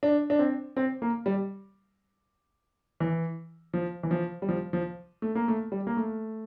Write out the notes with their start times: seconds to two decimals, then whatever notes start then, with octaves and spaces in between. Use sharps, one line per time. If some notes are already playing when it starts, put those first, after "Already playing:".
0.03 D4
0.30 D4
0.39 C4
0.77 C4
1.02 A#3
1.26 G3
3.00 E3
3.74 F3
4.03 E3
4.11 F3
4.42 G3
4.49 F3
4.73 F3
5.22 A3
5.35 A#3
5.48 A3
5.72 G3
5.87 A#3
5.97 A3